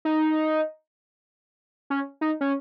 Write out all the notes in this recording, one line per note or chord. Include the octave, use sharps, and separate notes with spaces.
D#4
C#4
D#4
C#4